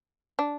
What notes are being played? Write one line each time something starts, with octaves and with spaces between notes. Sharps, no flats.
D4